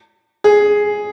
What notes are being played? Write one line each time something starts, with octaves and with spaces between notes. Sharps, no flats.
G#4